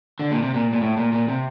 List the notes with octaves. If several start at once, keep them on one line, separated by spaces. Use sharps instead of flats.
D3
A#2
C3
A#2
A#2
A2
A#2
A#2
C3